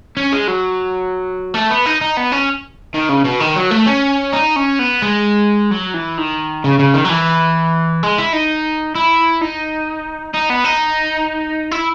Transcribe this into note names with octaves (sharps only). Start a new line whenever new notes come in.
C#4
G#3
F#3
A3
B3
D#4
D#4
B3
C#4
D#3
C#3
B2
D#3
F#3
A3
C#4
D#4
C#4
B3
G#3
F#3
E3
D#3
C#3
C#3
D#3
F#3
E3
G#3
E4
D#4
E4
D#4
D#4
B3
D#4
E4